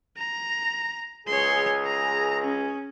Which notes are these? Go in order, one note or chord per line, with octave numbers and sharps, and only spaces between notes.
A#5
C#2 G#4 C#5 C6
A#5
C#4